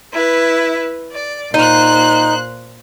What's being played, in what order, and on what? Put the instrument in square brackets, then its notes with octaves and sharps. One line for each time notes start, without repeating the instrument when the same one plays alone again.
[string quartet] E4 B4
D5
[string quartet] A#2 C5 F#6 [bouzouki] D#4